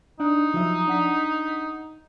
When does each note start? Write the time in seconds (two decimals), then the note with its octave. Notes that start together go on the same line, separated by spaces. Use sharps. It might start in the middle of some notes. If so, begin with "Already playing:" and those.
0.20 D4 D#4 D#5 F#6
0.54 F3 F#3 E5
0.87 D4 F#5 B6